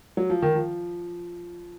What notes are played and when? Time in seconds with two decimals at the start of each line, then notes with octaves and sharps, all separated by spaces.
0.17 F#3
0.30 F3
0.42 D#3
0.55 F3